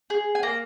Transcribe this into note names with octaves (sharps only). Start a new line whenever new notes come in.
G#4
G#5
A#3 A#5